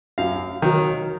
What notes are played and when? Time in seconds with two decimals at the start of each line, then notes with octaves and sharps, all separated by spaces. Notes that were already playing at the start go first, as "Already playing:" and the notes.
0.18 F#2 F5
0.62 D#3 F#3